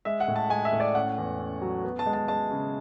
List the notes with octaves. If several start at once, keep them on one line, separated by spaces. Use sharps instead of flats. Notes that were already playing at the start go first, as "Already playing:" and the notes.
G#3 E5
F#5
A2
A5
G#3 G#5
E5
A2
D5
C#4 F#5
E2
C#4
F#3
B3
A5
G#3
A5
G#3 A5
C#3